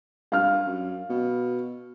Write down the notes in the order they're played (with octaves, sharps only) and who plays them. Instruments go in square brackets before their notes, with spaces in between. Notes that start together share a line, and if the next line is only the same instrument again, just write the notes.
[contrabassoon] G2 [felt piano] F5 F6
[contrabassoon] F#2
B2